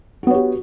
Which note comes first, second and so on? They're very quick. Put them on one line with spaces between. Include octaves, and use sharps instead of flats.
F#4 B3 C#5 G4